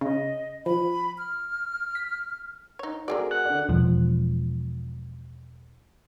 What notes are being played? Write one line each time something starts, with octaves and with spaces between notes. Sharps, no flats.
C#3 D#5
F3 B5
F6
B6
D#4 C#5
A3 C4 F#4 G#4 A#4 D5
F#5
D3 A4 D5
E1 F3